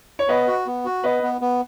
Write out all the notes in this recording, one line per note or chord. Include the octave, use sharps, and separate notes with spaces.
C#5
B3 B4 D#5
F#4
B3
F#4
B3 B4 D#5
B3
B3